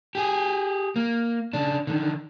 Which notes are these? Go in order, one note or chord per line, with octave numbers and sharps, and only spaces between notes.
G4 G#4
A#3
C#3 D4
D3 D#3